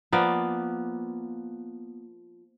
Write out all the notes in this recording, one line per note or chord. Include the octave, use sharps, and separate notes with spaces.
F3 A#3 B3 D5